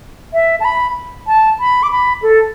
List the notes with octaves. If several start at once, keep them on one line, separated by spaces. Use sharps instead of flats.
E5
A5
B5
A5
B5
D6
B5
A4